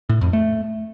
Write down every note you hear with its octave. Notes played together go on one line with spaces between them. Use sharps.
A2
F2
A3